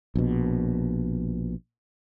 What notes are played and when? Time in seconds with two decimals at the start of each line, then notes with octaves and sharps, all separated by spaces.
0.15 A#1 B2